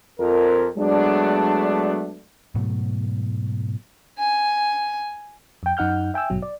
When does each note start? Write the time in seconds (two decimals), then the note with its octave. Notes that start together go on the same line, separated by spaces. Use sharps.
0.19 F2 A#4
0.77 F#3 G#3 A3 B3 D4
2.54 G#2 B2 F#3 A3
4.18 G#5
5.63 F2 G5
5.77 F#2 D#4 F#5 F6 G6
6.14 E5 G5 G#5 E6
6.30 A1 G2 B2 F#3
6.42 D5